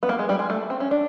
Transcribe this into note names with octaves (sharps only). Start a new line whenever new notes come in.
B3
A#3
G#3
G3
G#3
A3
C4
C#4
D4